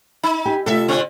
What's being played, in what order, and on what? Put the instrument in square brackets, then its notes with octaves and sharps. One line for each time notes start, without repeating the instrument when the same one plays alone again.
[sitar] D#4
[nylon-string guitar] G4 G#5
[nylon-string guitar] C3 A3 F4 [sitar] A4 E5
[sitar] D3 C4